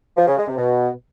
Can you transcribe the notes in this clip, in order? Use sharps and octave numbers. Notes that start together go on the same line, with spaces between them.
F3
C#3
G#3
C3
B2